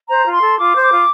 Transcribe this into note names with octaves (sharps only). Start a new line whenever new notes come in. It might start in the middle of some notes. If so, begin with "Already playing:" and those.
C5 A#5
F4
C6
A4
F4 D6
C5
D6
F4